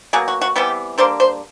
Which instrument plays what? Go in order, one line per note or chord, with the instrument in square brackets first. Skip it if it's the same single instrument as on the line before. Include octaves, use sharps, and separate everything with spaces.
[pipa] B2 F#3 A#3 G#4
F#4
F#4
C3 E3 G3 B3 G4
D3 G3 A#3 C5
C5